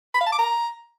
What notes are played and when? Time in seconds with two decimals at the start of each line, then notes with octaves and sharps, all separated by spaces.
0.14 B5
0.20 F5
0.26 A5
0.32 D6
0.38 A#5